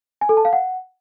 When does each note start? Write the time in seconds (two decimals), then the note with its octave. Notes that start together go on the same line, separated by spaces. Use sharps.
0.21 G#5
0.29 A4
0.37 A5
0.45 F5
0.53 F#5